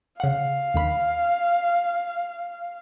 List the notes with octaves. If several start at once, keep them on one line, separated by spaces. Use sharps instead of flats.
C#3 F5 F#5
D#2 D#3 B5